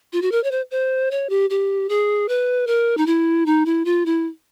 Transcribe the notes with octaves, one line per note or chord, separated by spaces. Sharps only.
F4
F#4
A#4
C#5
C5
C5
C#5
G4
G4
G#4
B4
A#4
D#4
E4
D#4
E4
F4
E4